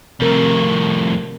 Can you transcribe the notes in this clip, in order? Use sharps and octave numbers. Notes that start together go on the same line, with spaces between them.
F2 A2 C3 A#4